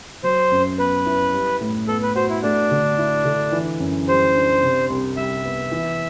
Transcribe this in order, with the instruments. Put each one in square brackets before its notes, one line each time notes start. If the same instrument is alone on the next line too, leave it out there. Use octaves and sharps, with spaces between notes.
[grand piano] F#3 [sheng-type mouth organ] C5
[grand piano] F#2
[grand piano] B3 [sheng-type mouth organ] B4
[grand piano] E4
G3
A2
[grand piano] B3 [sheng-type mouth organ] A4
[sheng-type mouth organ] B4
[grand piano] F#4 [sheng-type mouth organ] C5
[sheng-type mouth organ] E4
[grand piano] A3 [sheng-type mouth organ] D4
[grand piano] D3
E4
D3
E3
F#2
[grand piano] G3 [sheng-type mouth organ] C5
[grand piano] D4
C3
C2
[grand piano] G3 [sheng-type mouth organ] E5
[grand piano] B3
E3